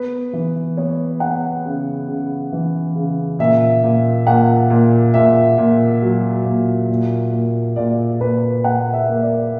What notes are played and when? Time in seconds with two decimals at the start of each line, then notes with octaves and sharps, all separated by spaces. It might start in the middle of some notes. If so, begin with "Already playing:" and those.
Already playing: B3 B4
0.33 E3
0.77 B3 C#5
1.20 B3 F#5
1.65 C#3
2.08 C#3
2.52 E3
2.95 C#3
3.39 A#2 E5
3.84 A#2
4.27 A#2 F#5
4.70 A#2
5.14 A#2 E5
5.58 A#2
6.02 F#3
6.45 A#2
6.89 A#2
7.32 A#2
7.76 A#2 D5
8.20 A#2 B4
8.64 A#2 F#5
8.93 E5
9.08 A#3
9.23 D5